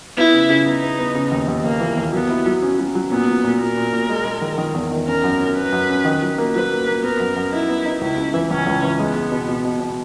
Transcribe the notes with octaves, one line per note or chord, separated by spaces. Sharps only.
B3 E4
C#3
C#3
B3 D#4
B3
B3
C#3
D#2
D#2
D#2 A#3
E3
D#2
F#3 B3
E4
F#3
C#4
F#3
F#3
A#2 B3
A#2
A#2
A#2 A#4
A#2
A#2
G#3
G#3
D#3
D#3
E2
D#3
C#4 A#4
F#2
C#4
C#4 B4
F#2
C#4
D#3
F#3
A#3
F#3 B4
A#3
A#3
B3 A#4
F#2
F#2
D#4 E4
B3
D#4
C#2 E4
C#3
E3
C#2 C#4
C#2
E3
G#3 B3
G#3
B2
B2
B2
B2